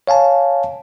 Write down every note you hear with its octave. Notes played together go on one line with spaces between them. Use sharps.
C#5 F5 G#5 A5